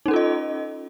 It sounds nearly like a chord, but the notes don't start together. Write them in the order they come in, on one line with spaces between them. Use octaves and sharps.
D#4 C#4 A4 F4 D#5